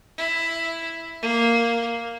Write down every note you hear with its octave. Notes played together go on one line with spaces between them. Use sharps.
E4
A#3